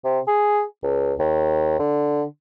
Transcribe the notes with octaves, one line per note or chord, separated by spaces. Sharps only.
C3
G#4
C#2
D#2
D3